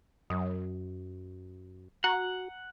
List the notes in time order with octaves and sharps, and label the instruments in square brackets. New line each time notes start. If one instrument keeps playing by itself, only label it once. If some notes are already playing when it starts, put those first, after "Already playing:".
[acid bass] F#2 [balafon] F#3
[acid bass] F#4 [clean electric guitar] F#5 [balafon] A#5